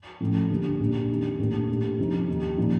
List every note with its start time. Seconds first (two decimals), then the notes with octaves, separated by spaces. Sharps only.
0.20 A1 A2 F3
0.50 D2 D3 G3 A#3
0.80 A#1 A#2 G3
1.10 F2 D#3 G3
1.39 A#1 A2 G3 A#3
1.69 A#1 A2 G3
1.99 F2 C3 F3 C4 D#4
2.28 D#2 D#3 G3
2.58 A#2 F3 A#3 D#4